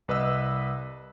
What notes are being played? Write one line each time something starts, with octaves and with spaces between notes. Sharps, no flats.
C2 B4 D#5 E6